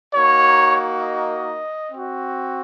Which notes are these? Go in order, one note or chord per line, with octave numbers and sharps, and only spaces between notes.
A#3 D#4 F#4 C#5
D#5
C4 F#4